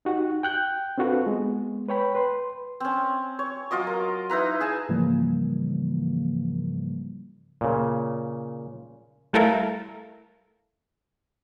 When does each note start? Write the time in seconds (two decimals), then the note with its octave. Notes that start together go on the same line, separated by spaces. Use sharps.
0.05 D#4 F#4 G4 F#5
0.43 G5 F#6 G6
0.98 C4 D4 F4 F#4 A4 B4
1.27 G#3 B3
1.89 B4 C#5 G5 B5
2.15 B4 C6
2.80 C4 C#4
3.39 C#5
3.71 F#3 F4 D#5 D6
3.87 A#4
4.30 D#4 E4 B4 A#5
4.60 G#4 G#5 A5
4.89 G#2 C#3 E3 F3 G3 A#3
7.61 A#2 C#3
9.33 G3 A3 E4 A4 A#4 F5